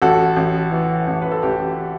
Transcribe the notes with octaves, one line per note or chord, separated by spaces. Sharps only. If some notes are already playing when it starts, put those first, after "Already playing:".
A1 F#4 A4
A1
E3
A1
B4
A4
A1 G4